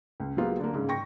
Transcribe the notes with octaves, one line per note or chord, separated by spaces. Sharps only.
C#2
F#3 G#3 A#3 B3 F4 G4
D3 A#3
G#2 C#3
G5 C#6 A#6